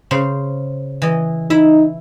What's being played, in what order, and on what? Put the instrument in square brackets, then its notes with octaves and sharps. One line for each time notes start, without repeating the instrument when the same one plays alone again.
[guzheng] C#3 C5
E3 D#5
[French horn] D#4 [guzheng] E4 E5